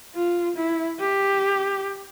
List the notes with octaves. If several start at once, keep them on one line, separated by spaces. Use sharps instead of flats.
F4
E4
G4